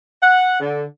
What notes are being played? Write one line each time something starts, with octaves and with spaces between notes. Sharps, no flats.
F#5
D3